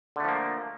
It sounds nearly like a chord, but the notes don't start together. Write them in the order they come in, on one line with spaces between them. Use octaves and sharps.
D3 A3 F3 A#3